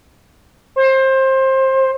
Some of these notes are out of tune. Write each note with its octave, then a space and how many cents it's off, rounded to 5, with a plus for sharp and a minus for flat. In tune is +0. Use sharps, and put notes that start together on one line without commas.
C5 +25